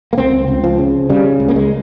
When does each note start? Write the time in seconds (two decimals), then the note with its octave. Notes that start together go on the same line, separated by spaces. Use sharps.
0.13 A#3
0.18 C#2 C4
0.48 C#2
0.64 F3
0.79 C#3
1.10 C#3 G3
1.40 C#2
1.48 A#3
1.56 G#3